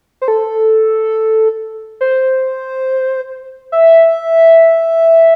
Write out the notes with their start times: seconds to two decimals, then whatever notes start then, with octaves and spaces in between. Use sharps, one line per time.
0.22 C5
0.28 A4
2.01 C5
3.72 E5